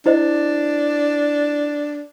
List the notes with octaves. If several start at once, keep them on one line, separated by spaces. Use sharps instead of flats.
D4 E4 C5 D#5